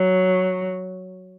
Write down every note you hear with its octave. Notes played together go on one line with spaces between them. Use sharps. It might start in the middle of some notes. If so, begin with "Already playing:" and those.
Already playing: F#3